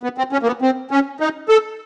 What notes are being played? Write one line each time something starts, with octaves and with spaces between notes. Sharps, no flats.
B3
C4
C#4
A#3
B3
C4
C#4
D#4
A4